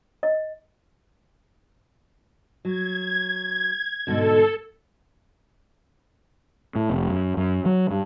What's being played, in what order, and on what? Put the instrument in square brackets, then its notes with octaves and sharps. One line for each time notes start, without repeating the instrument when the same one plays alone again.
[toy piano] D#5
[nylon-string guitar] F#3 [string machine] G#6
[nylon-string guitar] G#2 B2 D3 [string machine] A4
[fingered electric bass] A2
F1
F#2
F#2
F#3
G2